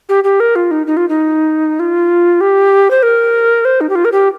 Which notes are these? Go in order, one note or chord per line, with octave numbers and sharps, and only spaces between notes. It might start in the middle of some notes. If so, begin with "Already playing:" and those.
G4
G4
A#4
F4
D#4
D#4
F4
D#4
F4
G4
C5
A#4
C5
D#4
G4
F4
A#4
G4